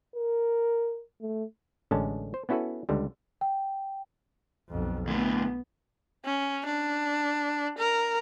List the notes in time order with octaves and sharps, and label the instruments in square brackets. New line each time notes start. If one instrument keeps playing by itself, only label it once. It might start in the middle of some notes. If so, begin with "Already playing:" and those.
[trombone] A#4
A3
[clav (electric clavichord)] A1 D3 G#3 C#4 A5
C5
B3 C#4 E4 F#4 A4 B4
C#2 D3 G3
[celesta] G5
[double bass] B1 F2
[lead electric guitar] D2 A2 [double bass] B3
[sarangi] C#4
D4
A#4